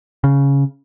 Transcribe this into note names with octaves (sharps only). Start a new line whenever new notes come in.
C#3